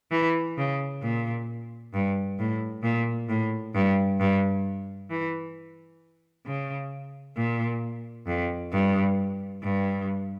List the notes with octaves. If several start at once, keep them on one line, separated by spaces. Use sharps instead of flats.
E3
C#3
A#2
G2
A2
A#2
A2
G2
G2
E3
C#3
A#2
F2
G2
G2